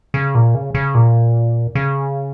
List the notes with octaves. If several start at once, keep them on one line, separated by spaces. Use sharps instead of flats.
C#3
A#2
C#3
C#3
A#2
C#3